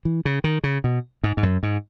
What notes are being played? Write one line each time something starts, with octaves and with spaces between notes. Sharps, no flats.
E3
C#3
D#3
C#3
B2
G#2
G#2
F#2
G#2